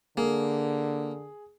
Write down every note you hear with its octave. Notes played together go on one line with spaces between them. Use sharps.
D3 A#3 G#4